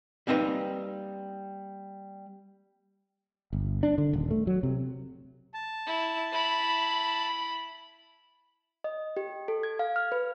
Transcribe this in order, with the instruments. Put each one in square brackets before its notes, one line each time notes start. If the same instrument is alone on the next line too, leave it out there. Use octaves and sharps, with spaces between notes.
[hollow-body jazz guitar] G3 A#3 C4 D#4 B4
[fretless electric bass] G1
D4
D3
D#1
A3
F#3
C3
[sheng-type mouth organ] A5
[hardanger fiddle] E4
E4 B5
[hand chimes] D#5
G4
A4
G#6
F5
F6
B4